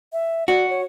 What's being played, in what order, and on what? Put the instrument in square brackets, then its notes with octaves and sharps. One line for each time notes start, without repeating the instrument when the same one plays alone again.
[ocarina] E5
[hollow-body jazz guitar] F#4 [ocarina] D5
[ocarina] C#5